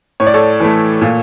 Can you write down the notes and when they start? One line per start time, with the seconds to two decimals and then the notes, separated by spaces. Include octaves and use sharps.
0.20 A2 C#5
0.27 D5
0.34 A4 C#5
0.60 E3 A3
1.02 A#2